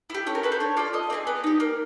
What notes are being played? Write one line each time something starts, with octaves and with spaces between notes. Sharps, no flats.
E4 G4
C#4 A4
A#4
F#4 A4 B4
C5
D4 C#5
F4 A4 D5
A3 D#5
C4 E4 G#4 D5
B3 D5
D#4 G4
A#3